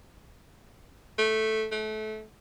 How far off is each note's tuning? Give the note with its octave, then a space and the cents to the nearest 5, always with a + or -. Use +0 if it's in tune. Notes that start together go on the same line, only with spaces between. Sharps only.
A3 -5
A3 -25